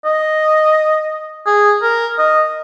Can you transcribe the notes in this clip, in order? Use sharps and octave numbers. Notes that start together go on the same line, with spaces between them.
D#5
G#4
A#4
D#5